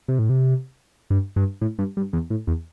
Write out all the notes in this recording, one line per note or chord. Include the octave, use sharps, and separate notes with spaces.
C3
A2
C3
G2
G2
A2
G2
G2
E2
A2
E2